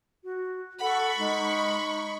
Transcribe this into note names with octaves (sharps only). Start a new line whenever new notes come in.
F#4
A4 F#5 B5 C#6
G#3 D#4